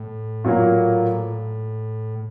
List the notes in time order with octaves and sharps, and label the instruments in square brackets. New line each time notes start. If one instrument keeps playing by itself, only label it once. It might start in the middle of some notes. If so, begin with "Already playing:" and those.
Already playing: [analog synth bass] A2
[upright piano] A#2 F#3 A#3